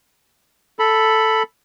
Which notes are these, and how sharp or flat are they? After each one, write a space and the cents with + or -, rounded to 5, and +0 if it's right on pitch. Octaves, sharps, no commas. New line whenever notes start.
A4 +0 B5 +0